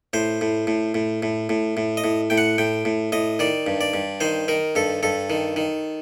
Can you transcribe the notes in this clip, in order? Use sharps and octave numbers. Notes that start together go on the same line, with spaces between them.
A2 C5
A2
A2
A2
A2
A2
A2
D#5
A2
A2 G5
F#5
A2 G5
A2
A2 D#5
D#3 D5
G2
D5
G2
D#3 C5
D#3 A#4
G2 A4
G2 A4
D#3
D#3